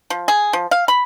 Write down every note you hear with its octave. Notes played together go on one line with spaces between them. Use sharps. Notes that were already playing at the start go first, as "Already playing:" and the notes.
F3
G#4
F3
F5
B5